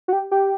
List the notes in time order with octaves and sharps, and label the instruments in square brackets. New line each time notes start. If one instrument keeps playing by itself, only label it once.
[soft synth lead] F#4
G4
G4